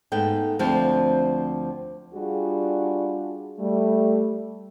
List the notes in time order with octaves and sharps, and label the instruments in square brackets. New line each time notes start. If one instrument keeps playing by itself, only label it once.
[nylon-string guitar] G#2 A3 B3 G5
D2 F3 C4 G5
[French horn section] G3 D4 F4 F#4 G#4
G3 A3